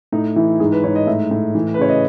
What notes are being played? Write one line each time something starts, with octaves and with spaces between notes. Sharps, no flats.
A2 D#4
E3 E4
G#2 G#4
B4
G#2 C#5
D#5
A2 E5
A2
E3
B4
C#3 C#5
D#5